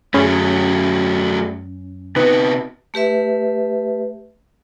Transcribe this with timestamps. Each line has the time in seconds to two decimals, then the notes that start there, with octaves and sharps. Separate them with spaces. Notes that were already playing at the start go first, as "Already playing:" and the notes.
0.14 F#2 F#3 A3 C#4 G#4 B5
2.16 C3 B3 D#4 B4
2.94 A3 G4 B4 E5